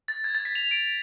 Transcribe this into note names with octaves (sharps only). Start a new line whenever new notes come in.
A6
G#6
A6
B6
F7
D7